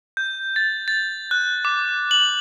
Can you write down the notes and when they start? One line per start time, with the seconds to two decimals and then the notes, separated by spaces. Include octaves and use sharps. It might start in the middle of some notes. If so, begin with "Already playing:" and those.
0.17 G6
0.56 A6
0.88 A6
1.31 F#6
1.65 D6
2.11 F#7